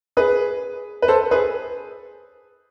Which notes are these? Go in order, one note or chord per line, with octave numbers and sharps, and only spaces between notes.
G#4 B4
B4
A4 C5
G#4 B4